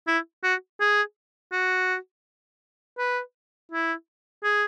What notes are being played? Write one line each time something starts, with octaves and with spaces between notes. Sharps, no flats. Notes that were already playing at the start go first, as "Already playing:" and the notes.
E4
F#4
G#4
F#4
B4
E4
G#4